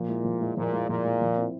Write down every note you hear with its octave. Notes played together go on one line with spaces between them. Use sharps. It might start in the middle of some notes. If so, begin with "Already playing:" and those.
Already playing: A#2 F3
G#3 E4
F3
G#3 E4
A#2 F3
G#3 E4
A#2 F3
G#3 E4
F3
C4 E4